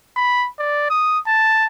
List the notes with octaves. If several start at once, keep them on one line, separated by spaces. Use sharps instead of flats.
B5
D5
D#6
A5